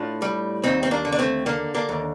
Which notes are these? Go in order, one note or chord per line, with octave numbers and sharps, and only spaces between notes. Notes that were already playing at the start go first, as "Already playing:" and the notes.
Already playing: A2 D4 F4
G3
D#2 C4 D#4
C4
A#3 D4
D3
D4
A3 C4
D3 A#3
A#3 D4
D#2